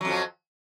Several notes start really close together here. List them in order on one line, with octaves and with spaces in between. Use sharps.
F#3 F2 F3